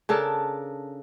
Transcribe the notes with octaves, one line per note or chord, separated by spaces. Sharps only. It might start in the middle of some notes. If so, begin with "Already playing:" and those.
C#3 D4 A4 A#4